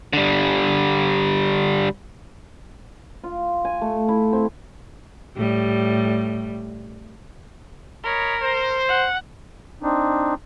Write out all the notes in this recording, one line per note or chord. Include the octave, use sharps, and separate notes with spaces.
D3 G3
F4
G#5
A3
E4
C4
A2 G3
A#4 C#5 D#5 B5
C5
F#5
C4 D4 D#4